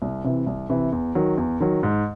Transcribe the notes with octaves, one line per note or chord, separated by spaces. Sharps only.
C2
C3 E3
C2
C3 E3
E2
D#3 F#3
E2
D#3 F#3
G#2